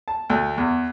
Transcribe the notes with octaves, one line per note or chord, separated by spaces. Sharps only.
A5
D2
E2